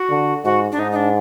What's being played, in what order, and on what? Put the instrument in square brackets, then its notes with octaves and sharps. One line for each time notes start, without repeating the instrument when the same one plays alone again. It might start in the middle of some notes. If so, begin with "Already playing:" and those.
Already playing: [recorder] F#4
[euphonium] D3
[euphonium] G#2 [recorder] F#4
[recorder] D4
[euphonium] G#2 [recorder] D#4
[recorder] D#4
D4